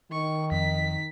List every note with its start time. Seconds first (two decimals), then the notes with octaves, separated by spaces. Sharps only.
0.12 D#3 C#6
0.52 F2 B6